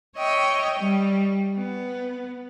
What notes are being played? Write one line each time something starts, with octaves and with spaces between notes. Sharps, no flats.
C#5 D#5 E5 G5
G3
B3